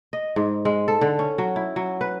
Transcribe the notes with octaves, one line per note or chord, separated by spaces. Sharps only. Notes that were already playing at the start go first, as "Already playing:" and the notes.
D#5
G#2
G#3
A4
D3
C#4
F#3
E4
F#3
B4